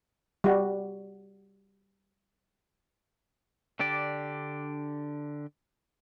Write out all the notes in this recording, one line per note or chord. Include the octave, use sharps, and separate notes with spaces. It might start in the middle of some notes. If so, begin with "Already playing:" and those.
G3 F#4
D3 D4 G4 D5